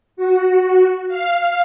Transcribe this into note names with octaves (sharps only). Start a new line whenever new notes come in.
F#4
F5